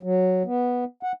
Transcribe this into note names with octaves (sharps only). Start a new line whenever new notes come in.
F#3
B3
F#5